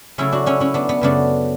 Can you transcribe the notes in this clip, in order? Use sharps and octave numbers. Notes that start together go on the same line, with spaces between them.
C#3 F#3 A3 C#4 E4
D4 F#4
C#4 E4
C#4 E4
B3 D4
B3
F#2 C#3 F#3 A3 B3 D4